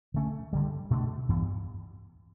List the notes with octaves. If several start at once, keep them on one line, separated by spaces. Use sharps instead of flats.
D3 A3 C#4
G2 D3 G3
B2 A3 D4
G2 E3 B3